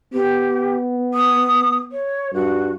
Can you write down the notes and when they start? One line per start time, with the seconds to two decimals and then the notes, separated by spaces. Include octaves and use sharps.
0.13 B3 G4
1.14 D#6
1.92 C#5
2.34 G2 F#4